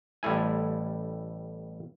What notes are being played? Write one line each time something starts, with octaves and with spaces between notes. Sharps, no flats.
A1 G3 A3 E4 G#5